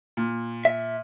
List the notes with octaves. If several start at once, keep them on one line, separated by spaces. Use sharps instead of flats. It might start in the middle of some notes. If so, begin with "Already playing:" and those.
A#2
E5